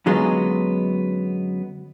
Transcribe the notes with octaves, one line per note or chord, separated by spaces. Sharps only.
F#2 D3 F#3 G#3 B3 F4